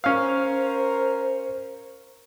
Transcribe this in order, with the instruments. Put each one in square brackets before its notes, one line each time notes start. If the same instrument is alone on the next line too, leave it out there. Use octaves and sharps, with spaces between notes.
[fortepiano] C#4 F5 [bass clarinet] A#4 [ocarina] C5